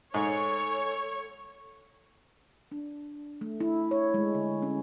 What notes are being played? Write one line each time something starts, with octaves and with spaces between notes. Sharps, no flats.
G#2 A4 C#5 C#6
D4
A3
E4
C#5
G#3
D3
C#4